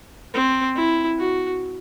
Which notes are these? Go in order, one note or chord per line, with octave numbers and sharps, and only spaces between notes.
C4
E4
F#4